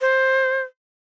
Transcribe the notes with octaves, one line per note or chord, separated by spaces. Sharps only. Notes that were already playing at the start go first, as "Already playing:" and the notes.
C5